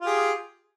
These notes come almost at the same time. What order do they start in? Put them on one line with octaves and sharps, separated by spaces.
F4 G4 G#4